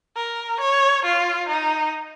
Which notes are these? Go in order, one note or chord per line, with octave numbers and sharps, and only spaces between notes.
A#4
C#5
F4
D#4